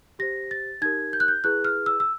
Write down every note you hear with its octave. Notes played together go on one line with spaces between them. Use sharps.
G4 C5 A#6
A6
D#4 G4 A#4 G#6
G6
F#6
G6
E4 G#4 B4 F#6
F6
E6
E6